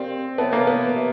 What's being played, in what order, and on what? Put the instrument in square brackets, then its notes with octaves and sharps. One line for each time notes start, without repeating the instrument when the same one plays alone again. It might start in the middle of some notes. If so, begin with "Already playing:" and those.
Already playing: [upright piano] C4 [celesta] G4 A#4 D5 F5
[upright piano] B3 [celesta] C#5 E5 A5
[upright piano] A#3
B3
[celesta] G4 B4 E5